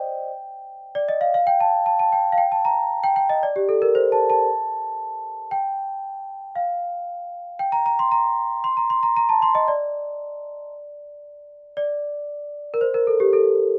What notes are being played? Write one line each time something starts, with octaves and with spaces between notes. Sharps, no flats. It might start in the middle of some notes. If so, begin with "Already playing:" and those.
Already playing: C5 D5 D#5 G5
D5
D#5
F5
F5
G5
A5
A5
A5
G5
F5
G5
A5
A#5
G5
G5
D#5
D5
G4
A4
A#4
C5
A5
A5
G5
F5
G5
A#5
A#5
C6
A#5
C6
A#5
C6
A#5
A#5
A5
C6
D#5
D5
D5
A#4
C5
A#4
A4
G4
A4